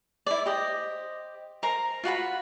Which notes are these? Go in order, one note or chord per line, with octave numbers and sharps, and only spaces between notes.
E4 D5
G4 C5 D#5
A#4 C5 A#5
F4 F#4 F#5 B5